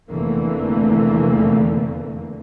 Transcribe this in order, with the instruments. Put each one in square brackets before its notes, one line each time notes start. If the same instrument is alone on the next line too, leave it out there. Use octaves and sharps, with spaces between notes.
[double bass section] F1 E2 D3 E3 A3 A#3